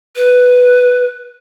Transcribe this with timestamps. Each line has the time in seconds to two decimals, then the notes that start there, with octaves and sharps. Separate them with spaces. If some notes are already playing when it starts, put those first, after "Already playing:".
0.16 B4